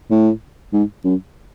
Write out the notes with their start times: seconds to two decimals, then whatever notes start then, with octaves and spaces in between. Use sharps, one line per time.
0.11 A2
0.73 G#2
1.05 F#2